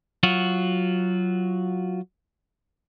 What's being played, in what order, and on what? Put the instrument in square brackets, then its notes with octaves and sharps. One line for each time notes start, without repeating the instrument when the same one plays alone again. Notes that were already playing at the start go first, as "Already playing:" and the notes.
[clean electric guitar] F#3 F4 F#4